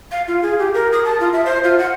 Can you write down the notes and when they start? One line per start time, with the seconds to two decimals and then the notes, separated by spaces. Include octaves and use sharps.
0.12 F5
0.28 F4
0.42 G#4
0.59 G4
0.74 A#4
0.92 D#6
1.05 A5
1.20 F4
1.33 E5
1.46 C5
1.64 F4
1.78 F#5